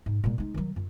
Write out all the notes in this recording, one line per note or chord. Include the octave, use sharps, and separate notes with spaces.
G#2
A#2 G#3
G#3 D#4
D#3 F#3
F#2 F4